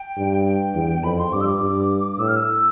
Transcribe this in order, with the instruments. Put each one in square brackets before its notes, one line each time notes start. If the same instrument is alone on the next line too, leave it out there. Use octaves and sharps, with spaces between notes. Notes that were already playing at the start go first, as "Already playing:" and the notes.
Already playing: [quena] G5
[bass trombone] G2
[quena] G5
[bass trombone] E2
[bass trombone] F2 [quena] B5
[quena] C6
[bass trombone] G2 [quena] D6
[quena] E6
D6
[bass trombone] G2
[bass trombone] A2 [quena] E6
[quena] F6
E6